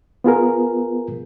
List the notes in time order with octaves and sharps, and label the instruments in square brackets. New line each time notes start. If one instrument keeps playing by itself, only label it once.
[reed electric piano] B3 F4 G#4 A#4